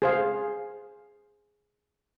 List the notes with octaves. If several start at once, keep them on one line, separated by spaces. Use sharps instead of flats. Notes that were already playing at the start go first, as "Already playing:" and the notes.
G#4 C5 F5